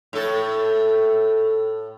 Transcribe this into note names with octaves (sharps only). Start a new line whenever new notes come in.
A2 A4